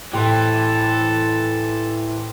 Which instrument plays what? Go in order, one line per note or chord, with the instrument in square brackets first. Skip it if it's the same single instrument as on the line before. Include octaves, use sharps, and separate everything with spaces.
[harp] A2 [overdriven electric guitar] E3 [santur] G4 C5 [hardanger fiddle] A4